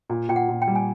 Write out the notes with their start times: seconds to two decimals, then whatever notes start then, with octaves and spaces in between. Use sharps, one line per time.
0.10 A#2
0.29 A#2 G5
0.36 F#5
0.49 A#2
0.62 G5
0.67 G3
0.75 G#5